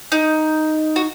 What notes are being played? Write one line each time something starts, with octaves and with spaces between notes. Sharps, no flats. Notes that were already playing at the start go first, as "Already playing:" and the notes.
D#4
F#4